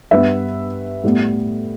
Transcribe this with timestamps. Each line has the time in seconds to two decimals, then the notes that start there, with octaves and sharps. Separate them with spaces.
0.11 G2 G3 B3 B4 E5
1.04 A2 G3 B3